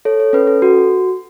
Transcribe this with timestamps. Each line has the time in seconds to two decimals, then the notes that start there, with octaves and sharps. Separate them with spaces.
0.05 A4 C#5
0.20 C#5
0.33 C#4 B4
0.47 A4
0.62 F#4